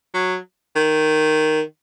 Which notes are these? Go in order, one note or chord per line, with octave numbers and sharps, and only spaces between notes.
F#3
D#3